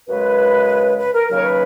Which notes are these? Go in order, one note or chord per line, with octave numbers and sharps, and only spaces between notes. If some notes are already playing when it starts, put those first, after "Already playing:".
F#2 C#3 G#3 B4
B4
A#4
D#2 C#3 F#3 A#4
C#5
B4